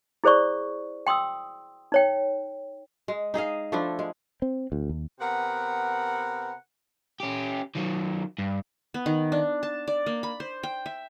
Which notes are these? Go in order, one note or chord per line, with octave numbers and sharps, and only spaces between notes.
E4 G#4 C5 D5 C#6
G5 C6 D#6 E6
D#4 C#5 G5
G#3
D#4 G#4 D#5 F5
F3 A3 D4 E4
G#3
C4
D2
D#2
C3 B3 A#4 F#5
C#4 G4
D#3 F#3
G2
B3
D#3
D4
A5
D5
A#3
B5
C5
G5
E5